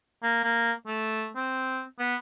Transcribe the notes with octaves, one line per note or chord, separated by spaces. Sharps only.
A#3
A#3
A3
C4
B3